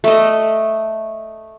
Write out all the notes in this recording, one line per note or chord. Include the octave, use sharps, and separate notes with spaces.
A3 D#5